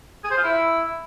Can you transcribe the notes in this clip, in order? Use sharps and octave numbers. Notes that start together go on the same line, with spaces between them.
G#4
C5
F4
E4